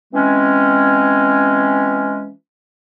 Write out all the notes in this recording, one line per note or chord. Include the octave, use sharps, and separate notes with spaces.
E3 G#3 C4 C#4